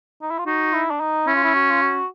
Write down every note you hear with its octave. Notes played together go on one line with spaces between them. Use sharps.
D#4
E4
F4
D#4 F#4
E4
D4
D#4
C#4 E4
F4
E4
F#4
F4
F#4